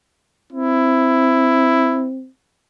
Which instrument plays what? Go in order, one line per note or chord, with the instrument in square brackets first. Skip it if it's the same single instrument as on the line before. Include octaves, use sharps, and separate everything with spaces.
[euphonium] C4 [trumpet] E4